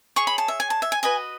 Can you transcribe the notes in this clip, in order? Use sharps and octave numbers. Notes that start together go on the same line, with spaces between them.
G#4 C#5 C#6
B5
A5
E5
G#5
A5
E5
G#5
F#4 B4 D#5 G#5